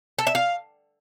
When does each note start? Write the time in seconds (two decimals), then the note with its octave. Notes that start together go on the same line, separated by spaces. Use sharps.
0.19 A4
0.27 E5
0.35 F5